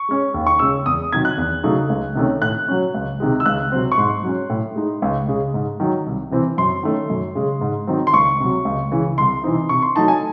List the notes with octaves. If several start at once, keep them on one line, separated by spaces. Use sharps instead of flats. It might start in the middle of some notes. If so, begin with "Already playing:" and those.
Already playing: C#6
G#3 C#4
D#2
C#6
C#3 G#3 C#4 E6
E2 D#6
C3 D#3 F#3 G#6
F#6
E2
C#3 F#3 A3 D#4
C#2
C3 D#3 A3 C#4
A2 F#6
F#3 C#4
C#2
C3 D#3 G#3
E6
C#2 F#6
C3 F#3 C4
C#6
G#2 C6
F#3 C#4
A2
G#3 D#4
C#2
C#3 G#3
G#2
D#3 F#3
C2
C3 E3 C4
F#2 C6
D#3 A3 C#4
F#2
C#3 G#3
G#2
D#3 F#3 C4
C6
C#2 C#6
C3 F#3
C#2
C#3 E3
C2 C6
C3 E3 C4 D#4
C3 C#6
C6
F#3 A3 D#4 A5
G#5